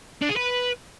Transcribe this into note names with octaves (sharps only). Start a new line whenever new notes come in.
D4
G#4
B4